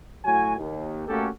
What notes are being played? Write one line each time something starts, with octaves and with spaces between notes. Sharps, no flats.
A2 F#3 F#4 G#5
D#2
A3 A#3 C#4 F#4 G4 A4